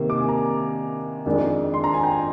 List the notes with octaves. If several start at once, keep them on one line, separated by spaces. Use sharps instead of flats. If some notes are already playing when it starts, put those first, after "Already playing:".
Already playing: C3 D#3 A#3
D6
G#5
A#5
F2 D#3 G#3 D4
C6
A#5
G#5
G5